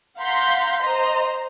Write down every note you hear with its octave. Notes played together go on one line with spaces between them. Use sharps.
F5 F#5 A#5 C6 G6 B6
C5 D#5 A#5 C6